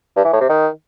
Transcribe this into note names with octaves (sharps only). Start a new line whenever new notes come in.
G2
E3
A2
C3
D#3